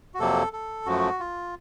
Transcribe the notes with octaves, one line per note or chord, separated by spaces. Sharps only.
F#4
F2 C3 F#3 A#3 A4
A4
F#2 F3 A3 F#4
F4